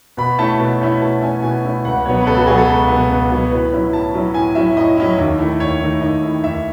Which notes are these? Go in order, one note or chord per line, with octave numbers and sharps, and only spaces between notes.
B2 B5
A3 C#4 E4 A5
B2
A3 C#4 E4
B2 A5
A3 C#4 E4 G#5
B2 G#5
A3 C#4 E4
C#2 F#5
B2 F#3 B3 C#5
B4
C#2 A4
F#4
B2 F#3 B3 G#4
A4
C#2
B2 F#3 B3
C#2
B2 F#3 B3
A2 B4
F#3 C#4 E4
A2 A5
F#3 C#4 E4
A2 G#5
F#3 C#4 E4 E5
A2 D#5
F#3 C#4 E4
D#2
D#3 A3 E4
D#2 C#5
D#3 A3 E4
D#2 D#5
D#3 A3 E4
D#2 E5